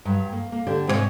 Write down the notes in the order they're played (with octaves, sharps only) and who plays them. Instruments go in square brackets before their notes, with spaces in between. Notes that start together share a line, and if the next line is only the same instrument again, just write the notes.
[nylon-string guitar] G2 F#3
A#3
A#3
D3 G4 D5
G#2 C3 F4 F#4 C#5 D5